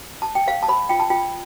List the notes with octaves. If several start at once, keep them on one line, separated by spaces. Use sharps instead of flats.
A5
G5
C5 F5
A5
C5 B5
F4 G5
A5
F4 G5